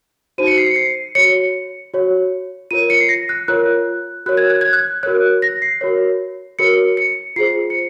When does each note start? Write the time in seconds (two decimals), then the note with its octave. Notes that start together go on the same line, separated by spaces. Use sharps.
0.38 D#4 F#4 C5 D#7
0.47 C#7
0.57 C7
0.67 C#7
0.76 C7
1.15 F#4 C#5 C#7
1.94 F#4 C#5
2.71 F4 A#4 C#5 D#7
2.90 C#7
3.00 C7
3.09 A#6
3.29 F#6
3.48 F4 A#4 C#5 F#6
4.26 F#4 A#4 C#5 F#6
4.37 G#6
4.50 F#6
4.61 G#6
4.73 F#6
5.03 F#4 A#4 C#5 F#6
5.42 A#6
5.62 C7
5.81 F#4 A#4 C#5
6.59 F#4 A#4 C#5 C#7
6.97 C#7
7.36 F4 G#4 C5 C7
7.70 C#7